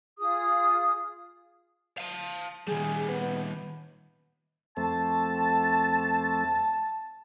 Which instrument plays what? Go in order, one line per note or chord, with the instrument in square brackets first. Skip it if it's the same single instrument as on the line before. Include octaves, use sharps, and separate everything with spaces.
[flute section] F4 G#4 D#6
[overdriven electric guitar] F5 A5
[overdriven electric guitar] D#3 G3 [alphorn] G#4
[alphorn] B3
[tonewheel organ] F2 A3 C4 [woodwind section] A5